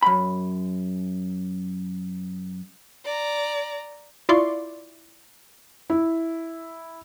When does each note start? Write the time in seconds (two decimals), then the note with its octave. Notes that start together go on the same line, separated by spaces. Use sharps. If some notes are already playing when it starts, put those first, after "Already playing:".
0.03 F#2 B5
3.05 D5 A#5
4.29 E4 F4 D5 C6 C#6
5.90 E4